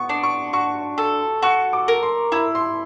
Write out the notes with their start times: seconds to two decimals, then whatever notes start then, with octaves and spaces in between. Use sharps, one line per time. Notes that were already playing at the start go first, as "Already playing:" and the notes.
Already playing: B3 C#6
0.09 D4
0.23 C#6
0.53 F#4 C#6
0.98 A4
1.42 F#4 C#6
1.73 D6
1.88 A#4
2.03 C6
2.32 E4 B5
2.55 C6